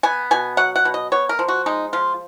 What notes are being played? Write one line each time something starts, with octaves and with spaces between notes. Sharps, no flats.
B3 G#5
B2 G#5
F#3 F#5
F#5
B2
D#5
B3 C#5
A#4
F3
F#4
G#3 D#4
F3 F4